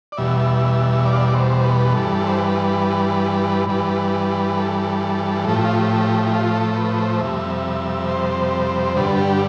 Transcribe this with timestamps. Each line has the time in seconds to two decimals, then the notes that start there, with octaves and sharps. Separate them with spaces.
0.12 D5
0.17 E2 B2 G3 E5
1.06 D5
1.13 F5
1.21 E5
1.28 D5
1.35 C5
1.64 B4
1.93 G2 E3 G3 A4
2.27 C5
2.37 B4
3.69 G2 E3 G3 B4
4.57 A4
5.44 A2 F3 A3 A4
5.55 G4
5.65 F4
5.75 G4
6.27 E4
6.33 F4
6.55 A4
6.72 A4
6.76 B4
6.98 C5
7.21 F2 C3 G3 E5
8.09 C5
8.96 G2 D3 G3 B4
9.18 G4